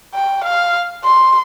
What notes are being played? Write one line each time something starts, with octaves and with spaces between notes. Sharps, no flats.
G5
F5
C6